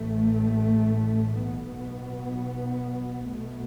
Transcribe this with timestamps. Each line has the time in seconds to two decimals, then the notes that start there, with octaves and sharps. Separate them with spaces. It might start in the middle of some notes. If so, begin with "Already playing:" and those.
Already playing: A1 A2 A3
1.43 B1 B2 B3
3.30 B1 B2 A3